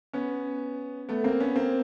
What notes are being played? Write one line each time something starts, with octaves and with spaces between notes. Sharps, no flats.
B3 C#4
A3 B3
A#3 C4
B3 C#4
A#3 C4